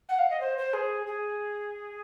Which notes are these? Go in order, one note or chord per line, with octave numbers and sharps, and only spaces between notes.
F#5
F5
D#5
C5
C5
G#4
G#4